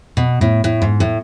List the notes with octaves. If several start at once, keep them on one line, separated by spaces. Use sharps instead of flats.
B2
A2
A2
G#2
A2